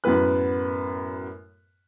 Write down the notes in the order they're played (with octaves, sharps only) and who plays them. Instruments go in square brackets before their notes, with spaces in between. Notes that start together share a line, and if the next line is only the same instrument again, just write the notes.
[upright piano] F#2 A2 B3 B4 F#6